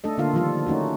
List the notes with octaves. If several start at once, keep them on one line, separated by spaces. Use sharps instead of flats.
A3 D4 A4 D#5
D3 A#3 F4 F5
D#3 F3 G3 F4 A4
A3 C#4 D#4 F#4